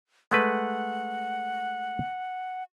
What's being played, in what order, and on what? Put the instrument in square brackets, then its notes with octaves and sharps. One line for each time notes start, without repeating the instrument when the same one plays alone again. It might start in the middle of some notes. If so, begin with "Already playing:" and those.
[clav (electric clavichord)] G#3 A3 B4 [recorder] F#5